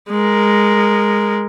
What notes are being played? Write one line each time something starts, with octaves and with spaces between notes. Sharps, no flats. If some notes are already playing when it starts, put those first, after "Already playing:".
G#3 A#4